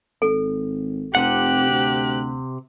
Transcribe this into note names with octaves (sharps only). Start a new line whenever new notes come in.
G#1 A4
F1 C3 G4 F#5 F#6
D2